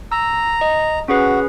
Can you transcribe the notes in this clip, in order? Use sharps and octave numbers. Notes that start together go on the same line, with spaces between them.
A#5 E6
D#5
C#4 F#4 G#4 B4